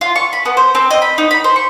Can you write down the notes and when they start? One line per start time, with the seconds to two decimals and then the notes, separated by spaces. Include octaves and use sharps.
0.01 F4
0.16 C#6
0.33 B5
0.45 B3
0.57 C5
0.75 C4
0.91 D#5
1.02 B5
1.18 D#4
1.31 B5
1.44 C5
1.56 C#6